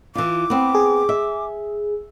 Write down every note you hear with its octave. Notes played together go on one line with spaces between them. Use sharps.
E3 F4 D6
B3 C4
G#4
E5